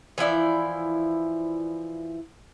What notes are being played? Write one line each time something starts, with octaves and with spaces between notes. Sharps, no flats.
E3 F3 E4 D5